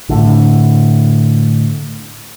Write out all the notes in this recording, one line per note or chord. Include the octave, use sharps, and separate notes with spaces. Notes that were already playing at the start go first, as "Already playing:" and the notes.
A2 D3